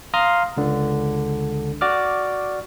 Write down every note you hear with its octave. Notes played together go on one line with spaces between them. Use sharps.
F5 A#5 C6 D#6 F6
C#2 D3
F#4 D5 D6 F6